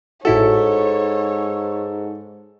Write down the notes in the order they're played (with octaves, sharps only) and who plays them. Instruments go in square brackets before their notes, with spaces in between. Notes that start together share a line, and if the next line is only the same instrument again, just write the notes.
[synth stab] A1 E4 F#4 [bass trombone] G#2 [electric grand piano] A4 [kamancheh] C#5